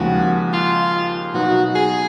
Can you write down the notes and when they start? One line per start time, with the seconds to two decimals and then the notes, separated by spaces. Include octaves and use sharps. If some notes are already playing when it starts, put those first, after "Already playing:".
Already playing: D#2 C#3 F3 G#3 F#4
0.53 F4
1.34 B2 F#3 B3 D#4 F#4
1.75 G#4